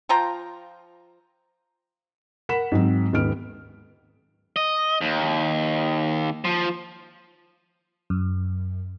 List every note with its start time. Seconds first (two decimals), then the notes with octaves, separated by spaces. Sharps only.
0.09 F3 F4 G5 A#5
2.49 A#4 F#5 B5 B6 E7
2.72 G#2 F#3 C4
3.13 D#1 G#2 B3 F6 D7
4.56 D#5
5.01 D#2
6.45 F3
8.10 F#2